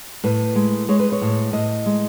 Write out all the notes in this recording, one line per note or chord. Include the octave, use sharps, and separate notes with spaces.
A2 B4
G#3
G#3 C#5
B4
C#5
A2
A2 D#5
G#3